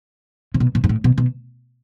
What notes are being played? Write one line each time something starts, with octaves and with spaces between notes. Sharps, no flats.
C3
B2
A#2
G#2
A2
B2
B2